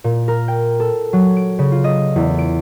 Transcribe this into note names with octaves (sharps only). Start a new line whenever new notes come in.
A#2
A#4
G5
A4
F#3
D7
C#3
F4
D#5
E2
D7